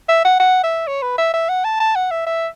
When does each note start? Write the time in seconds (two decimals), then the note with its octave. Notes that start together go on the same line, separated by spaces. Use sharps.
0.09 E5
0.25 F#5
0.40 F#5
0.64 E5
0.87 C#5
1.02 B4
1.18 E5
1.34 E5
1.49 F#5
1.64 A5
1.80 A5
1.96 F#5
2.11 E5
2.27 E5